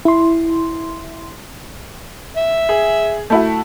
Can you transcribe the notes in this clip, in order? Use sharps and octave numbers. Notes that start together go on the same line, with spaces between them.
E4 C6
E5
G#4
A3 E4 F#4